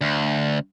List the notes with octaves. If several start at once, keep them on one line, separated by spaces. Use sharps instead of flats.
D2